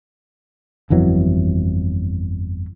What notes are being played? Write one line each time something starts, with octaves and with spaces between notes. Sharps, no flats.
G1 F2 E3 F#3